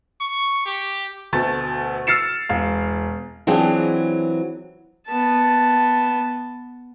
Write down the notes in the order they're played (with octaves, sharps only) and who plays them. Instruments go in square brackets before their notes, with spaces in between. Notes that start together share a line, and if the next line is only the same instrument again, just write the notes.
[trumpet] C#6
G4
[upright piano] D2 B2 A3 A6
E6 F6 A6 C7 C#7 E7
E1 F5
[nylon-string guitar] E3 F#3 C4 D4 F4 G#4
[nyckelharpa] B3 A5